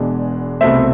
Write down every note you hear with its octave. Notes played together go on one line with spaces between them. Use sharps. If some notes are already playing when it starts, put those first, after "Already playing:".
Already playing: E1 E2 B2 G#3 D4
C2 B2 A3 C4 E5